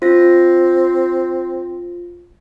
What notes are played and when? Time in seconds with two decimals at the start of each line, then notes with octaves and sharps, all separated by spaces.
0.02 C4 F4 A#6